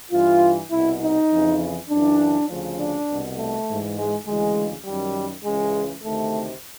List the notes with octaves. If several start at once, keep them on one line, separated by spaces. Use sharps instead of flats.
G2 E3 F4
C2 B2 E4
D#4
F2 C#3 E3
F#2 C#3 E3 D4
D2 C#3 F3
D4
C2 B2
A3
G#2 E3
G#3
D2 C#3 E3 G#3
F#2 D#3 G3
C#2 C#3 E3 G#3
D2 C3 D#3 A3